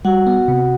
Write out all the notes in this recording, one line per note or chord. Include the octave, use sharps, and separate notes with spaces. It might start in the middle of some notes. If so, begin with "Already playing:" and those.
G3 F#4 F#5
B3
C3